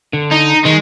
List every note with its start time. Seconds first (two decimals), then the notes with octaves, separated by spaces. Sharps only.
0.13 D3
0.32 D#4
0.65 D#3 G#3